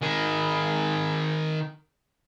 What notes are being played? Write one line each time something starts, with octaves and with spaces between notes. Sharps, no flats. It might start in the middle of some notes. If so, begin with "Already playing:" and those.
D#3 G#4